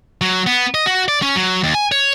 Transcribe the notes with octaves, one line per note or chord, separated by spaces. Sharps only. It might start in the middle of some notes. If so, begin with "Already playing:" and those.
F#3
B3
D#5
F#4
D5
C#4
F#3
D#2
G#5
C#5